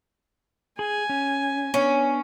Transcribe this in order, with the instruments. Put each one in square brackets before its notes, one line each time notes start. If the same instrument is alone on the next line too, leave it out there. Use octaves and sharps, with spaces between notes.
[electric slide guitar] G#4 [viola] G#5
[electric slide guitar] C#4
[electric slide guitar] B3 D4 [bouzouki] C#4